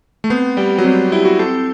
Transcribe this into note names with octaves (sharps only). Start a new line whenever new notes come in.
A3
B3 C4
G3 G4
F#3
G3 C4
E4 G4
F#4
C4 A4